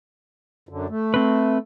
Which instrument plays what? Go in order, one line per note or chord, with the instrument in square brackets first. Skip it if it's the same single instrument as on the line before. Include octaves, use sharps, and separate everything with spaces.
[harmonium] F#2 D3
A3
[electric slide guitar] C4 B4